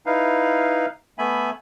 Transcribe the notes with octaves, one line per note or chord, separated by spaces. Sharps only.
D#4 E4 B4 F5
A3 B3 E5 G#5 B5